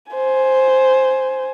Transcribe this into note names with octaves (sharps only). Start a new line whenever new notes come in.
C5 G#5